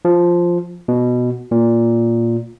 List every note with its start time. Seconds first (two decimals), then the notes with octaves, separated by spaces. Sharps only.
0.05 F3
0.88 B2
1.51 A#2